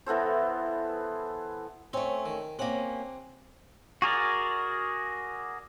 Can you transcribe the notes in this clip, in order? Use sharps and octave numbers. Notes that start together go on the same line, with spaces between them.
E3 B3 A4 C5
A3 C4 C#4
D#3
C3 A#3 C#4 F#5
F#4 G#4 A#4 D5